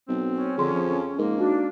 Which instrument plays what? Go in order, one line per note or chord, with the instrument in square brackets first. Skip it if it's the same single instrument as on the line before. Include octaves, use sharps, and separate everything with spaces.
[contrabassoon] B1 [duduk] C4
[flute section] C#4
[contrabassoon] F2 [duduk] D3 [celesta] G#4 C6
[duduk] F3
[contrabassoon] G#2 [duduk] A#3 [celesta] A#4
[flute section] D4 [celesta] D#4 F#4